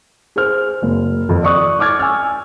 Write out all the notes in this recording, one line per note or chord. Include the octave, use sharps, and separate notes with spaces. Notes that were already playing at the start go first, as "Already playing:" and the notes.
G#4 C5 F6
F#1
F2
D5 C#6 D#6 F#6
C#6 D6 F6 G#6 A6
G#5 E6 F6